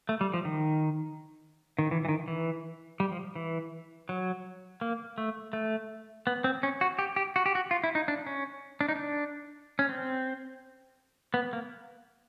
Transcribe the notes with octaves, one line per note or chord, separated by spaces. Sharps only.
A3
G3
F3
D#3
D#3
E3
E3
D#3
E3
G3
F3
E3
F#3
A#3
A3
A3
B3
C4
C#4
F#4
G4
G4
F#4
G4
F#4
F4
E4
D#4
D4
C#4
D4
D#4
D4
C#4
C4
B3
A#3